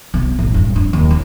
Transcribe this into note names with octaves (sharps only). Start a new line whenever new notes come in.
B1
A1
G2
D4
D#2
E4